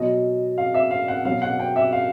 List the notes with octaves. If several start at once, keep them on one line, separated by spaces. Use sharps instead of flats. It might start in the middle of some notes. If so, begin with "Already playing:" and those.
Already playing: B2 F#3 D#5
F5
E5
F5
F#5
B2 F#3 F5
F#5
G5
E5
F5